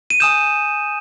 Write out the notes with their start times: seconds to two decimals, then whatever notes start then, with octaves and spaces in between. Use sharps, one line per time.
0.10 D#7
0.20 G#5 D#6 G6 E7